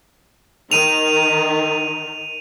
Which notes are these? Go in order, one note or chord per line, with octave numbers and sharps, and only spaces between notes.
D#3 D#7 F7